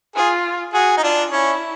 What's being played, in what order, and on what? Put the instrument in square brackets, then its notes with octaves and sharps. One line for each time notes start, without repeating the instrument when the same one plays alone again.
[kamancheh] F4 [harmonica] G#4
[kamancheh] F#4 [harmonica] G#4
[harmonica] D#4
[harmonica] D4 [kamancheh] F4
[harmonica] C#4 [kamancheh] E4